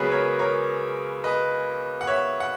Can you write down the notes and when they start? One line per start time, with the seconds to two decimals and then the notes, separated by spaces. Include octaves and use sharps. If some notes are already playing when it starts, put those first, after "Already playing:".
Already playing: C#2 C#3 F#3 B3 G#4 A#4 B4 C#5
0.12 A#4 C#5
0.39 A#4 C#5
1.24 B4 D#5
2.01 F#5
2.07 C#5 E5
2.40 F#5